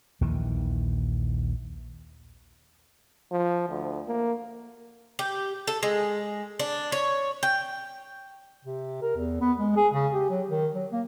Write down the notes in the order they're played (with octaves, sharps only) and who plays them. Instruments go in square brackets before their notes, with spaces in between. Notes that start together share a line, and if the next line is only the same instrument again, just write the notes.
[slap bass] A#1 D#2 D#3 E3
[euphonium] F3
D2
A#3
[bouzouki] G4
A4
G#3
D4
C#5
G5
[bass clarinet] C3
A#4
E2
B3
G#3
G#4
C#3
G4
F#3
D#3
F#3
A#3